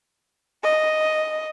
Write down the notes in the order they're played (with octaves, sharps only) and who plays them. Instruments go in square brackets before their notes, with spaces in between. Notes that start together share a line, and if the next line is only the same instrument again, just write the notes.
[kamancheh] D#5